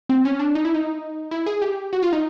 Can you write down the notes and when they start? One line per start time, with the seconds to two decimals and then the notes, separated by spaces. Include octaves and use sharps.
0.09 C4
0.25 C#4
0.39 D4
0.55 D#4
0.65 E4
0.74 D#4
1.31 E4
1.46 G#4
1.62 G4
1.93 F#4
2.03 F4
2.13 D#4